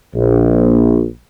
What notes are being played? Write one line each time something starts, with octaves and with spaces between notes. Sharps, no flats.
A#1